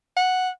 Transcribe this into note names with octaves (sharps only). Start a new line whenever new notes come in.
F#5